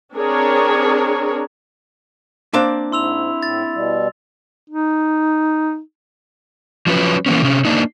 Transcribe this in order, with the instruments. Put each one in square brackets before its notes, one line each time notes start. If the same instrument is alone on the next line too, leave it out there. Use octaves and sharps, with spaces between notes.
[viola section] C4 D4 G#4 A#4 C#5
[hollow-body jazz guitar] A#3 C4 D4
[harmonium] G#2 [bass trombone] E4 [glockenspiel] C6 E6 F7
[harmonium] A2 [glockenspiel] A6
[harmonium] B2 G3
[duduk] D#4
[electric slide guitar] F3 F#3 C#4 B4
E3 A#3 B3 C#4
C3 C#4
A#3 D4 D#4